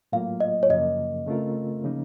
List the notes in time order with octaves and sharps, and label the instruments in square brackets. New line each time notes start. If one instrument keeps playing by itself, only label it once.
[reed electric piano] A2 F#3 A#3 F4 [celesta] F5
[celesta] D#5
C#5
[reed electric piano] F#2 C#3 F3 A#3 [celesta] D#5
[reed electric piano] C#3 A3 C4 F4 A#4
C#3 F3 A#3 D#4